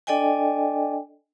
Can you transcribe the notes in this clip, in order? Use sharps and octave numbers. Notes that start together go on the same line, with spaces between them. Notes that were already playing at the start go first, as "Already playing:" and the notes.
D4 A4 D5 D#5 G5 G#5